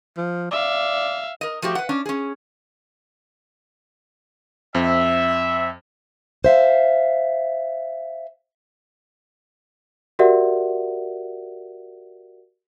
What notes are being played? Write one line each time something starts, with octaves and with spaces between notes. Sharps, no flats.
F3
D5 E5 F5
A#4 D#5
F3 A3 F#4 G4
B4 F#5
C#4 D4
C#4 G#4
F2 C4 E5
C5 E5 F5
F#4 G4 A#4 D5 E5 F#5